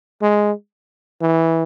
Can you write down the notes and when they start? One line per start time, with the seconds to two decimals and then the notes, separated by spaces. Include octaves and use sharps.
0.22 G#3
1.21 E3